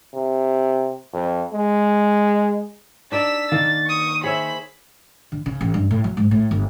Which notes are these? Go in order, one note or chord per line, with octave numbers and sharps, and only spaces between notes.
C3
F2
G#3
D4 D#4 D5 E6 B6
D#3 A#3 A6
C#6 D#6
G#4 C5 C#5 E5 B5
D3
C#3
A1
G2
A2
F#3
G#2
A2
G1